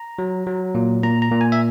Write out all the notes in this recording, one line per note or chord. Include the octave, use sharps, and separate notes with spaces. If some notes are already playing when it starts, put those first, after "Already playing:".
Already playing: A#5
F#3
F#3
A#2
A#2 A#5
A#5
A#2
G#5
E5